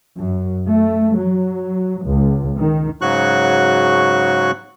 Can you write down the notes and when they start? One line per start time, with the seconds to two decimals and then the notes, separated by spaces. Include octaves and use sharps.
0.14 F#2
0.69 A3
1.18 F#3
2.05 C#2
2.57 D#3
3.01 G#2 C#3 F#3 F#4 C#6 F#6